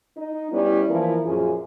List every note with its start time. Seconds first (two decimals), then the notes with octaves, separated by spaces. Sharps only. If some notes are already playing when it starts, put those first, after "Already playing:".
0.17 D#4
0.52 G3 B3 C#4 E4
0.90 E3 F3 A#3 E4 A#4
1.25 F#2 A#2 F3 C#4 F4 G#4